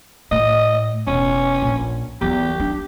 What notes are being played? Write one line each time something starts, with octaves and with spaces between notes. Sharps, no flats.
A2 D#5
E1 C#4
A#1
E2 F#3 G4
D4